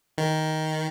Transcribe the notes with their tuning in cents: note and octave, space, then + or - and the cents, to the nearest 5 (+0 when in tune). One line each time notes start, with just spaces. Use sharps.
D#3 +10